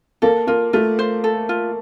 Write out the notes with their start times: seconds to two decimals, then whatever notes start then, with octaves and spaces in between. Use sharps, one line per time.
0.22 A#3 A4
0.47 A#3 F4
0.73 A3 F4
0.99 C5
1.24 A4
1.49 F4